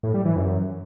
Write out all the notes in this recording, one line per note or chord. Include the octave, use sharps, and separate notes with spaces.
A2
G3
E3
F#2